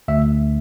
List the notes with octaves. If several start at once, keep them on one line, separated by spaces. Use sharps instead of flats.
D2 E5